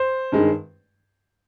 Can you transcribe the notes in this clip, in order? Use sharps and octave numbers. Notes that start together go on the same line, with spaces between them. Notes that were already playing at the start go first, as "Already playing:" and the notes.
Already playing: C5
G2 D#3 G#3